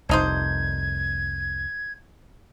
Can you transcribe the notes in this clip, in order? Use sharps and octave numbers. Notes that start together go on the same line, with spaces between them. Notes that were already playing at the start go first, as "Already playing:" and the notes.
F1 C2 D4 D#4 C5 G#6